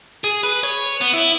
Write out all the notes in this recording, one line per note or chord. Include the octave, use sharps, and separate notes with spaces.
G#4
B4
C#5
B3
E4